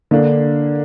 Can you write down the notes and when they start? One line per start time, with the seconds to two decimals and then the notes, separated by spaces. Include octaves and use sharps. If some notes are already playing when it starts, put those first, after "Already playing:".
0.11 D3 A#3 D4